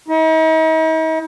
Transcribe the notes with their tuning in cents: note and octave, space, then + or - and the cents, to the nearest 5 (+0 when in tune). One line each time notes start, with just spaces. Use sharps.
D#4 +45